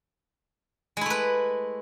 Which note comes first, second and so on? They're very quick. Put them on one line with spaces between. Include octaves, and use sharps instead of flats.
G#3 E4 A3 B4